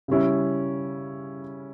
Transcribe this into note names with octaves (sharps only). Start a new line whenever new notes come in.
C#3 G3 C#4 E4